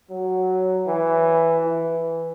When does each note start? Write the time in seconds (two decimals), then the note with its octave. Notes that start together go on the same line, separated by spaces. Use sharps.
0.10 F#3
0.87 E3
1.65 E3